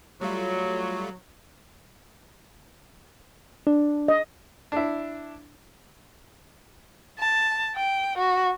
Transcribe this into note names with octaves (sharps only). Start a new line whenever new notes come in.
F#3 G3 A3 F4
D4
D#5
D4 E4
A5
G5
F#4